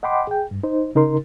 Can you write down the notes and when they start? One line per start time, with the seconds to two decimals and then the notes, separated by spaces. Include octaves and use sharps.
0.03 D#5 F#5 G5 B5 C6 D6
0.27 G#4 G5
0.51 G2
0.63 D#4 C5
0.95 C#3 D#4 A#4 C6